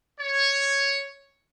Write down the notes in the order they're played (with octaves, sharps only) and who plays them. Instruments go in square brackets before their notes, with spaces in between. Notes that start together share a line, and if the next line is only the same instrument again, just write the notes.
[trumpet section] C#5